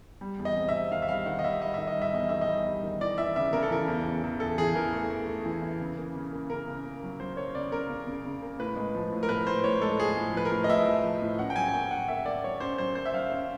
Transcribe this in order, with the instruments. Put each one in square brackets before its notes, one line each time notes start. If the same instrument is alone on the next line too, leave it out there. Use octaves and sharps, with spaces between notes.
[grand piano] G3
E2
D#5
C3
E5
C3
D#3 F5
E5
G3 F5
D#3 F#5
D#5
G3 E5
G3 D#5
D#3 E5
D#5
G3 E5
E2 D#5
D#3 E5
D#5
G3
G3
D#3
E3 D5
E3 E5
C#3 E5
C#3 A#4
A4
E3 A#4
E2
E2
E2
E2 A4
E3 G#4
E3 A#4
A3
A3
A3
E3
E3
C#3
A#3
C#3
A#3
C#3 A#4
C#3
A#3
F#3
F#3 C5
A#3 C#5
C#3 D5
C#3 A#4
C#3
C#3
C#3
A#3
A2 B4
G#3
F3
A2
A#4
A2 B4
A2 C5
A2 C#5
G#3 A4
F3 G#4
A2
F3 B4
A#4
A2
D#5
A2 E5
F3
F3
A2
C#4 F#5
G5
F#3 G#5
G#5
A#3 G5
C#4 F#5
A#3 E5
A#3 D5
F#3 C#5
C#4 C5
F#3 C5
A#3 C5
E5
F#3 F5
C#4